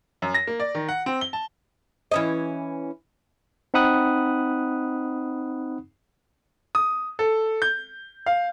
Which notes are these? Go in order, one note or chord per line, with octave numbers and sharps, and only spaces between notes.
F#2
A#6
A#3
D5
D#3
F#5
C4
G7
A5
E3 C#4 D#5
C4 D#4 F#5 B5 D#6 F#6
D#6
A4
G6
F5